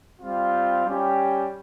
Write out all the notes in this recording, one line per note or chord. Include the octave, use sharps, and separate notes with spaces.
G3 C4 F4
G3 C#4 G4